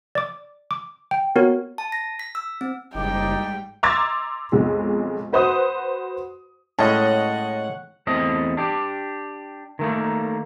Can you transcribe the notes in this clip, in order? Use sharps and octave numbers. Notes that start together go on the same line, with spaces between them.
D5 D6
D6
G5
B3 F#4 A#4 C#5
A5
A#6
B6
E6
C4
F#1 G#2 G3 D#4 G5 D6
A#5 C6 D6 E6 G#6 A6
B1 F2 G#3
F#4 B4 C5 F#5 D#6
A2 G#3 C#4 C#5 D#5 F#5 A5
E2 A3 C4 D#5
D4 G4
D#3 A3 A#3